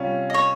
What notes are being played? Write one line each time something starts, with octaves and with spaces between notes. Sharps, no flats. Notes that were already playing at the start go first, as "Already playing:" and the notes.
Already playing: C3 G3 C#4 F4
D#5
C#5